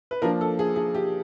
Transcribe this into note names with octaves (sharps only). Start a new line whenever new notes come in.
B4
F3 A#3 D4 A#4
A4
G#4
G#4
G4